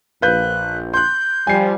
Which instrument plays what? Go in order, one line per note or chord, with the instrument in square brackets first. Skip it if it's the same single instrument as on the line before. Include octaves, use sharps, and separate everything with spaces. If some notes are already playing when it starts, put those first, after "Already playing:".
[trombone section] A#1 [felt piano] B4 F5 G6 [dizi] F#6
[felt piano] C6 F#6 [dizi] G6
[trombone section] F3 G3 [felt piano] G#5 C7